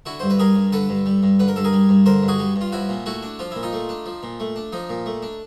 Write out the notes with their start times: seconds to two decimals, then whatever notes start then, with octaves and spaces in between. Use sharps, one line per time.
0.06 D3 E4 F#4
0.20 G2 C5
0.30 B4
0.39 G3 G#4 A#4
0.55 G2
0.72 D3 A4 B4
0.89 G2
1.06 G3
1.23 G2
1.39 D3 B4
1.48 A#4
1.56 G2 A4
1.64 G#4 A#4
1.73 G3
1.89 G2
2.06 D3 A#4 C5
2.23 G2
2.28 F#4 G#4
2.39 G3
2.56 G2
2.61 F4
2.72 F3 E4 F#4
2.89 A#2
3.06 A3 E4 F#4
3.23 D4
3.39 F3 F4
3.51 A#2 E4
3.63 D#4 F4
3.73 A3
3.89 D4
4.06 F3
4.23 A#2
4.40 A3
4.56 D4
4.73 F3 D#4
4.89 A#2
5.06 A3
5.23 D4